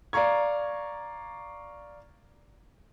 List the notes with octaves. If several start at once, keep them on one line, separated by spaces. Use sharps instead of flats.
D5 F5 A#5 C#6 G#6